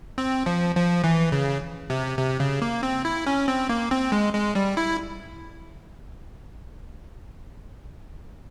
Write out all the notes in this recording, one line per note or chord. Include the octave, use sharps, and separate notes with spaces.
C4
F3
F3
E3
C#3
C3
C3
C#3
A#3
C4
E4
C#4
C4
A#3
C4
G#3
G#3
G3
E4